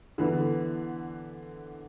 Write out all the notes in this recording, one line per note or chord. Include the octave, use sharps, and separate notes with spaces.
D3 E3 B3